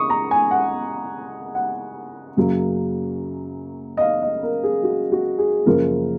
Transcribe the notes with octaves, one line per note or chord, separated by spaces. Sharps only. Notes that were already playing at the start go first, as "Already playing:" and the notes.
Already playing: C#2 C#6 D#6
A#5
G#5
F#5
F#5
F#2 C#3 F#3 A#3
D#5
F5
D#5
A#4
G#4
F#4
F#4
G#4
F#2 C#3 F3 A#3 A#4